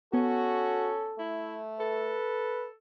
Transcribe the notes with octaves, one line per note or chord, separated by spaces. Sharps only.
B3 C#4 F#4 A4
A3 E4
A4 B4